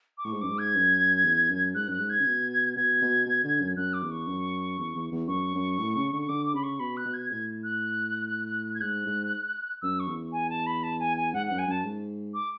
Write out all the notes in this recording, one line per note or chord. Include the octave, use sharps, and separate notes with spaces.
D6
A2 C#6
G#2
F#2 D6
G#2
G#6
F#2
E2
F#2
G#2 F#6
F#2
F#6
G#2
G#6
C#3
B2
B2 G#6
B2
B2
D3
F#2
F#2 F#6
D6
E2
C#6
F#2
E2
E2
E2
F#2 C#6
F#2
A2
C#3
D3
C#6
D3 D6
D6
C#3 B5
C#6
B2 B5
F#6
B2
G#6
A2 G#6
F#6
G#6
G#2 F#6
G#2
F#2 E6
C#6
E2
G#5
A5
B5
A5
G#5
G#5
G#2 F#5
F#2 F#5
G#5
F#2 A5
G#2
D6